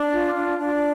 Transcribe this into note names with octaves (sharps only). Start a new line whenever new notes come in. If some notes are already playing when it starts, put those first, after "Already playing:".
Already playing: D4
F4
D4
D4